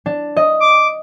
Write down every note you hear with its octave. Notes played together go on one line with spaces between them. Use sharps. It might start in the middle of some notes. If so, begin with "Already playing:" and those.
D4
D#5
D6